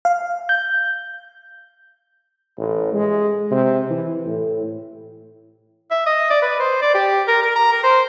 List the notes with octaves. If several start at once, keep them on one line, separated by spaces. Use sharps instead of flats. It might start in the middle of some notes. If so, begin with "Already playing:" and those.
F5
G6
A1
G#3
C3
E3
A2
E5
D#5
D5
B4
C5
D5
G4
A#4
A#4
A#5
A#4
C5